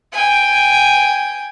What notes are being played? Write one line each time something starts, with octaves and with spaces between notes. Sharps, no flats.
G5 G#5